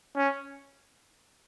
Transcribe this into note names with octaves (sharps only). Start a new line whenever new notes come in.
C#4